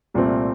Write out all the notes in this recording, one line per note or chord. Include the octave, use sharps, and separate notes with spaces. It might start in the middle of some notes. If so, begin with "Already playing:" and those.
C2 A#2 A3 C4